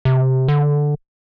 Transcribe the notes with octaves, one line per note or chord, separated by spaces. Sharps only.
C3
D3